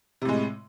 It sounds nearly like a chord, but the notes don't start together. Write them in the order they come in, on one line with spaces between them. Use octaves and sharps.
C3 A2 G#3